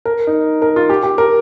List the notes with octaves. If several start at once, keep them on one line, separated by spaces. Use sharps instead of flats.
A#4
D#4
A#4
F4
G4
G4
A#4